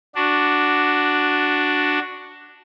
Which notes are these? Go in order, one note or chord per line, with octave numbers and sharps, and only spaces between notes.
D4 F#4